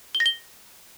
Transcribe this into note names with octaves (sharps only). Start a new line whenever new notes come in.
G7
A#6
G7